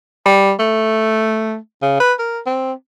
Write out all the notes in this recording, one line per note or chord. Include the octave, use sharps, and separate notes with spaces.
G3
A3
C#3
B4
A#4
C4